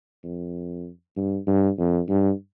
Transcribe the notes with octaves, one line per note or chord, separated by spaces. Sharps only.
F2
G2
G2
F2
G2